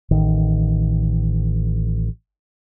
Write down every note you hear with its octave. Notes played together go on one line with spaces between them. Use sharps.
A1 D#3